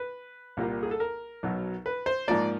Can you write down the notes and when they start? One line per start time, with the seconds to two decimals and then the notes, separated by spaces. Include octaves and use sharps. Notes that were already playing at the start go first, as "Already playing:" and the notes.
Already playing: B4
0.57 C2 A#2 G3 A#3
0.83 G#4
0.91 A4
1.00 A#4
1.43 B1 B2 F#3
1.86 B4
2.06 C5
2.28 G#2 F3 A#3 D5